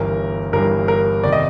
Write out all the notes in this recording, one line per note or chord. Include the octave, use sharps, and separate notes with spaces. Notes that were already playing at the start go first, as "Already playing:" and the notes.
Already playing: G1 G2 E3 A#4
G1 G2 E3 A#4
A#4
F1 D#3 D5
D#5